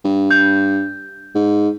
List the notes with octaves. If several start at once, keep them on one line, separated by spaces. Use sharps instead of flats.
G2
G6
G#2